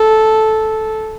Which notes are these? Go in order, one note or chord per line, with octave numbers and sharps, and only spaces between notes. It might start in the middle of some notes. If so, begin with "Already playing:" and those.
Already playing: A4